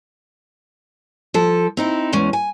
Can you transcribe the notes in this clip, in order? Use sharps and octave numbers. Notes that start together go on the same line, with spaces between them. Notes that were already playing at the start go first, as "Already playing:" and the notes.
F3 A4
C4 D#4 E4
E2 G#3 C#4
G#5